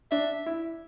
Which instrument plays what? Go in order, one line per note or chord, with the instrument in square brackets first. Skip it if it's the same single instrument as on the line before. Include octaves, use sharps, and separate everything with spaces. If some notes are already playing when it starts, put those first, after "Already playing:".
[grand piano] D4 [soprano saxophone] E5
[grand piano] E4